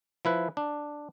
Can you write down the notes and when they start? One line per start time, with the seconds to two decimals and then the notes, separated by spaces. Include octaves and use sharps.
0.25 F3 E4 B4
0.57 D4